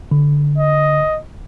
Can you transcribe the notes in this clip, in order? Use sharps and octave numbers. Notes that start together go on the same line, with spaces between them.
D3
D#5